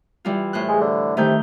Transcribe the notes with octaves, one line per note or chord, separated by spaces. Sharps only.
E3 G3 F4
A2 C5 F#6
G#3
D3
C3 D#3 A3 G6